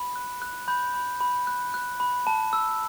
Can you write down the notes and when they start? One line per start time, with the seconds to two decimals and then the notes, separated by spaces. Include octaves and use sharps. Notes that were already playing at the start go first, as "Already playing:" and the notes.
Already playing: B5
0.16 F#6
0.42 F#6
0.68 B5 G6
0.94 B5
1.21 B5
1.47 F#6
1.74 F#6
2.00 B5
2.27 A5
2.53 E6